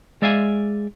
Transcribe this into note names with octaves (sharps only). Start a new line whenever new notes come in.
G#3 D5 E5 F5 G#5